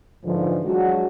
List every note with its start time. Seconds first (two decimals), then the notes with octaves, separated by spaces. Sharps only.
0.25 G#2 D3 E3 F3
0.65 F#3 G#3 D4 F#4